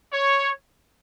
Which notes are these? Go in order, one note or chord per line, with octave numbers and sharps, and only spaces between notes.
C#5